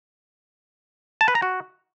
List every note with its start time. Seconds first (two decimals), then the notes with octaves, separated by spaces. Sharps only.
1.21 A5
1.28 B4
1.35 A#5
1.42 F#4